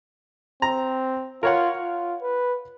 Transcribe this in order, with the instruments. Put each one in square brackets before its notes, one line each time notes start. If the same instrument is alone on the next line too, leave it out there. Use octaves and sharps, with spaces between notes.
[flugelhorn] C4 [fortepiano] A#5
[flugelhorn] F4 [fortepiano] A#4 C#5 F#5
[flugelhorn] F4
B4